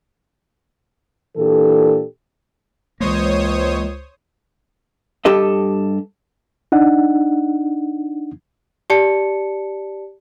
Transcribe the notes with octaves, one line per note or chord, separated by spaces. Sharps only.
A#2 E3 D4 G4 A4
C#2 E3 G#3 A#3 C5 C#5 D#6
G2 G4 A4 D#5
D4 D#4 F#5
G4 D5 A5 C#7